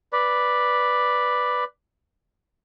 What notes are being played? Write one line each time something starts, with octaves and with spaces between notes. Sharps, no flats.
B4 D5